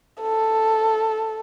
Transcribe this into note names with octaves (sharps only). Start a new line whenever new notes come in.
A4